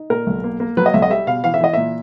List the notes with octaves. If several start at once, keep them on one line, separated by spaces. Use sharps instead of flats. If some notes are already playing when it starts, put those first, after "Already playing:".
Already playing: D#4
A#2 A#4
B1
A#3
A#3
F#3 B4
D#5
B1 E5
D#5
G3 E5
B2 F5
E3 F5
E5
E3 D#5
A#2 E5